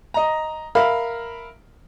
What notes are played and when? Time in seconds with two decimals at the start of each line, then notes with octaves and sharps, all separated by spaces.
0.14 D#5 A#5
0.75 A#4 E5 F5 B5